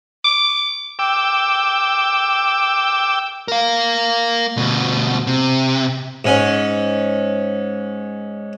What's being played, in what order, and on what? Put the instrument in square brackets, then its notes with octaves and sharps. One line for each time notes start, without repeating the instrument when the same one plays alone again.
[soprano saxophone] D6
[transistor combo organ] G5 D6 E6
[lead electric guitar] A#4 F5
D2 B2
C3
[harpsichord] G#2 C#4